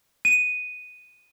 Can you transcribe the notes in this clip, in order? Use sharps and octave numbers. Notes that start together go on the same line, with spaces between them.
D#7